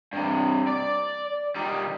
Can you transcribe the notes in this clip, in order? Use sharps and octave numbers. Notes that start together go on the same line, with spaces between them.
G2 C3
D5
D#3 G3